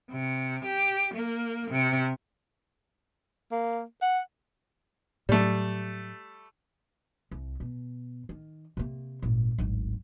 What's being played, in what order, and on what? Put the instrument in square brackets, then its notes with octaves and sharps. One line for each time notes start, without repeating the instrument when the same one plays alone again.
[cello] C3
G4
A#3
C3
[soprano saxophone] A#3
F#5
[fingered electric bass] A2 F#3 [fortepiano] G3 A3
[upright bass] C2
B2
D#3
C3 A#3
G#1 A#2
D1 G#1